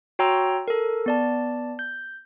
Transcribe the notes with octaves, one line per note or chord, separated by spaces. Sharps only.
F#4 C#5 G5 A#5 C6 E6
A4 A#4
B3 D5 A5
G6